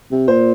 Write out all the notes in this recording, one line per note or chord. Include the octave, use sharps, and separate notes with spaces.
C3
A#2 C5